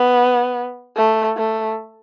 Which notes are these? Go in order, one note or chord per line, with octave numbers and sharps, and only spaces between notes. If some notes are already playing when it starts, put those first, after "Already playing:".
Already playing: B3
A3
A3